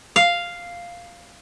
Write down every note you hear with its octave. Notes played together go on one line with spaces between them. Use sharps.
F5